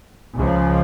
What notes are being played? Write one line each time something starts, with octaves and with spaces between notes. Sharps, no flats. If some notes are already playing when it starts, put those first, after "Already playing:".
C#2 C#3 F3